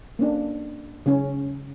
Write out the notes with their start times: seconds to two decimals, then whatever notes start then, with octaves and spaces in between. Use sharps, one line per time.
0.19 A#3 C#4 D4
1.06 C#3 C#4